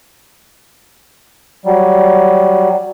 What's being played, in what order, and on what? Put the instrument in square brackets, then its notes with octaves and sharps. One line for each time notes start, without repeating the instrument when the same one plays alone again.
[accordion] F#3 G3